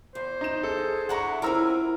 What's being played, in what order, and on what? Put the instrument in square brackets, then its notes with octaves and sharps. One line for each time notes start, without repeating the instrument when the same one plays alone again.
[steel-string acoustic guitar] E2 [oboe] C5
[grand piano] D#4 E7
[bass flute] G#4 [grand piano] A4
[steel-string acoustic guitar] D4 E4 A4 [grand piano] F#5 A#5 C#6
[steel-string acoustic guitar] F3 C4 C#4 [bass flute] E4 [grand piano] A#4 A#5 E6